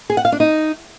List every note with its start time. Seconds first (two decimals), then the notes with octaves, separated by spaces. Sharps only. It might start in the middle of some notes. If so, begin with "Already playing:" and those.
0.10 G#4
0.17 F#5
0.25 F5
0.32 D4
0.40 D#4